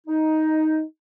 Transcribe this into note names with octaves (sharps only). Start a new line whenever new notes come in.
D#4